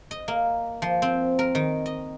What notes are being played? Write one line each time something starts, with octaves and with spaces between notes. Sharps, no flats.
D#5
A#3
F3
C4
A#4
D#3
D#5